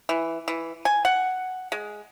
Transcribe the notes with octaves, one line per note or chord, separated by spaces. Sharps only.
E3
E3
G#5
F#5
G#3